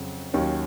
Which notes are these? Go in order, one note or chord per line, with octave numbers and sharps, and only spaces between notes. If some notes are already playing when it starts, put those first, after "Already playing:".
Already playing: F2 C#3 F#3
D#2 D#3 F#3 C#4